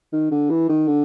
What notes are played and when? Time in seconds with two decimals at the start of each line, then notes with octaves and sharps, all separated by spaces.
0.13 D#3
0.31 D3
0.50 E3
0.69 D#3
0.87 D3